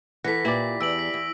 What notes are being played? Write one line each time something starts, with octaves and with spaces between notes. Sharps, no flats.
E3 A4 F#5 A#6 B6
A#2 E4 G4 D5
E2 E6 D7 F#7
B6
E2